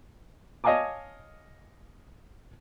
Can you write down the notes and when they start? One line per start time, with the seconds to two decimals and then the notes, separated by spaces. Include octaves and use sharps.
0.64 C#5 D#5 F5 G#5 A5 D6